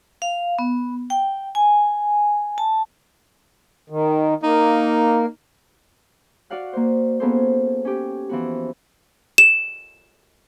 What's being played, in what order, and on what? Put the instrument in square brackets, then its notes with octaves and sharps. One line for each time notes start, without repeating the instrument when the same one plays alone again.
[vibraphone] F5
B3
G5
G#5
A5
[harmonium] D#3
[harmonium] A#3 [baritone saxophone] D#4
[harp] F#4 D5 F5 F#5 F#6
A#3 C5
A#3 B3 C#4 G#4 A4 C5
C#4 G4
E3 F3 B3 F#4
[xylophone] E7